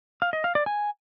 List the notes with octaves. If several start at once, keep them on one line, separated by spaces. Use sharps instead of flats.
F5
D#5
F5
D5
G#5